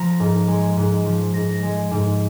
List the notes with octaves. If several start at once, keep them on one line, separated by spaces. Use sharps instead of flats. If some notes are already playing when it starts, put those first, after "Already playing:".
Already playing: F3 A#5
G#2
G#3
G#2
F3
G#2 A#6
G#3
G#2